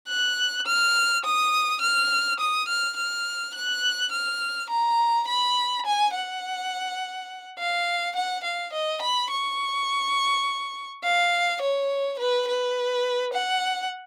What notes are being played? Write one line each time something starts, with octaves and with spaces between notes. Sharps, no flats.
F#6
F6
D#6
F6
D#6
F6
F6
F#6
F6
A#5
B5
G#5
F#5
F5
F#5
F5
D#5
B5
C#6
F5
C#5
B4
B4
F#5